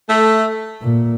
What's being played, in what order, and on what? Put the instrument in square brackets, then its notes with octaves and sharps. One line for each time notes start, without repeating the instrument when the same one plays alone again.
[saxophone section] A3
[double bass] A#2